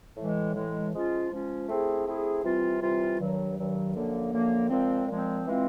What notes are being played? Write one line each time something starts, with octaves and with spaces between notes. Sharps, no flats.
A2 E3 G#3
A2 E3 G#3
F3 G#3 C#4 F4
F3 G#3 C#4 F4
A3 C4 E4 G#4
A3 C4 E4 G#4
C3 E3 G3 C4 F4
C3 E3 G3 C4 F4
G2 D#3 F#3
G2 D#3 F#3
F#2 D3 F3 A#3
F#2 D3 F3 A#3
A#2 F3 G#3 C4
A#2 F3 G#3 C4
E3 G#3 C4 F4